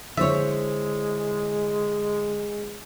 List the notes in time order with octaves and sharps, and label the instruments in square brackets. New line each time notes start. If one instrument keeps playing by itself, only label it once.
[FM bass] D3 [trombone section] G#3 [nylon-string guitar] E4 C5 C#5 [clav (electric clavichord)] E5